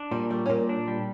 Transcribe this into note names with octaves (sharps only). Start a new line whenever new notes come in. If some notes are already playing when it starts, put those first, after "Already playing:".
Already playing: D4
A#2 G3
G3 A3
C#4
A#2 A#3
D4
G3